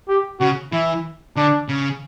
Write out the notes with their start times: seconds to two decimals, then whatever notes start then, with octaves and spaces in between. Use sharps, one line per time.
0.09 G4
0.40 C#3 F#4
0.73 E3 E4
1.36 D3 D4
1.69 C#3